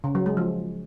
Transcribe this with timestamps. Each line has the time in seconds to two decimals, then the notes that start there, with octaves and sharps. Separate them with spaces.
0.04 C#3
0.15 F#3
0.26 G#3
0.37 F3